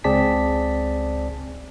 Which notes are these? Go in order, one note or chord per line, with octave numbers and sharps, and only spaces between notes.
C#2 C4 G#4 D5 A5 B6